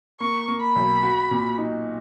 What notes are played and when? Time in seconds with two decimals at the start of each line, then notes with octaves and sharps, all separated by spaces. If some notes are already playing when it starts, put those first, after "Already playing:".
0.20 A#3 C#6
0.48 A#3
0.62 B5
0.76 B1
1.03 F#4
1.31 A#2
1.58 D#4